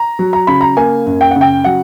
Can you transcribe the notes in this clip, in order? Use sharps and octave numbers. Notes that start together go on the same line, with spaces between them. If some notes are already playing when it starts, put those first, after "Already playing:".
Already playing: A#5
F#3
A#5
C#3 B5
A#5
A#3 G#5
F#2
G5
C#3 F#5
G5
F#3 F#5